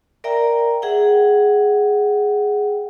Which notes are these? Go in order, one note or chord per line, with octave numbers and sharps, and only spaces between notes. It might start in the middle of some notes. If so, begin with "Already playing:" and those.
A#4 D5 E5 G5 A#5
G#4 E5 F#5 G5